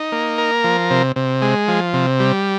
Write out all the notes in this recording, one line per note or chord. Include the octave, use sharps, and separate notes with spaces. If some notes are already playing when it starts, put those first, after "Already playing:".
Already playing: D#4
A#3
A#4
F3
C3
C3
G#3
F3
C3
G3